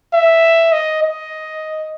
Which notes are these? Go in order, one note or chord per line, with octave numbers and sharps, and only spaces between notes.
E5
D#5
D#5